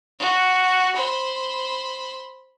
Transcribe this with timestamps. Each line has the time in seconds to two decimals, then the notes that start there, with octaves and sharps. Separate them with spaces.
0.19 F#4
0.95 C5 B5